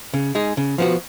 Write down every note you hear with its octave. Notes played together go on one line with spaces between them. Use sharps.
C#3
G#3 D#4 G#4
C#3
F3 B3 F#4